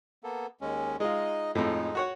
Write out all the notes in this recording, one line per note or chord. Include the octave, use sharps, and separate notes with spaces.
A#3 B3 A4
D#2 G#3 C#4
G#3 D#4 F4 D#5
F2 A2 G#3 D#4
F#4 C#5 F#5